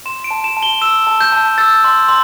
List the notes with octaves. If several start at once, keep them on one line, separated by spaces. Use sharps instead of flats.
C6 E7
D7
A5
E7
A5
G7
E6 E7
A5
G6
A5
E6 A6
C6
C6